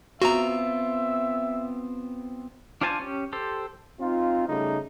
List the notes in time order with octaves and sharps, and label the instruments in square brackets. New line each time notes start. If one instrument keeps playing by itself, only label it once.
[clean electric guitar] B3 C4 F4 [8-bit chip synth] F#4 A#5 [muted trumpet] E5
[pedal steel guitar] D4 F4 C5 G#5 A5
C#4 G4
G4 A4 C5
[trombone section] C4 D#4 F4
C#3 G3 A3 D#4